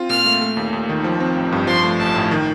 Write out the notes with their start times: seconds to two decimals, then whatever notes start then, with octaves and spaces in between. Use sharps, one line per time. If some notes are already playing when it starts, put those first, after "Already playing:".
Already playing: C4 F4
0.10 A#2 F6
0.26 A3
0.41 A3
0.57 D#2
0.73 D#2
0.89 D#3
1.04 F3
1.20 C4
1.37 A1
1.52 G2
1.67 F3 C6
1.84 A3
1.99 A1 A5
2.15 A2
2.31 D#3